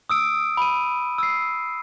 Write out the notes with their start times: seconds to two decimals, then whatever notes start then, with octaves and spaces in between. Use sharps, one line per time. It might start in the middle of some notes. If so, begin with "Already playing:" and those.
0.10 D#6 E6 D7
0.57 B5 D#7
1.18 E6 C7